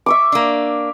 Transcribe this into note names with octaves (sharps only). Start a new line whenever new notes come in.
E5 C#6 D6
A#3 D4